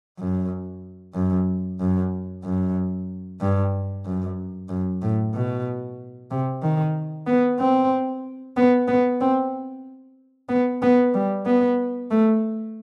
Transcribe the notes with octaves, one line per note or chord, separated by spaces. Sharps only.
F#2
F#2
F#2
F#2
G2
F#2
F#2
A2
B2
C3
D#3
B3
C4
B3
B3
C4
B3
B3
G3
B3
A3